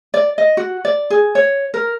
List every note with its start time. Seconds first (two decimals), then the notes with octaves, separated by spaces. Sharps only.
0.14 D5
0.38 D#5
0.57 F#4
0.85 D5
1.10 G#4
1.35 C#5
1.74 A#4